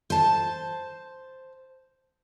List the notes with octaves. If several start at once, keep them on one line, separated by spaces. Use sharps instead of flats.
C5 A5